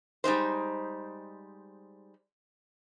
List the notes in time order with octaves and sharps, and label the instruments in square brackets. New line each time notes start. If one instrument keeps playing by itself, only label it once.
[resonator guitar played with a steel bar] G3 G#3 D#4 C5